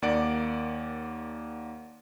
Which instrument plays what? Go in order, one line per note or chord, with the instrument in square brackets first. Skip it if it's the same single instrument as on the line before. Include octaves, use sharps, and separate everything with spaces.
[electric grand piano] D#2 A#3 D5 F#5 D7